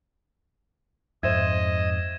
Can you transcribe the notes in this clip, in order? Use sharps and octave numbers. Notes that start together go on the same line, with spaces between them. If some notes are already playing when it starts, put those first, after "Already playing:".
F2 G#2 C5 D#5 E5 G#6 E7